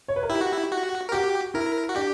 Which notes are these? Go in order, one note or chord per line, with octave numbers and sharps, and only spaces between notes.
C#5
B4
A#4
E4 G4
F#4
E4
F#4
A#4
F#4 G4
E4 A#4
F#4
D4 G4